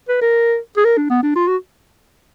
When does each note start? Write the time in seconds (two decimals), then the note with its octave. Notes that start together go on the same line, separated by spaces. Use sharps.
0.09 B4
0.21 A#4
0.77 G#4
0.85 A#4
0.97 D4
1.10 B3
1.23 D4
1.36 F4
1.48 F#4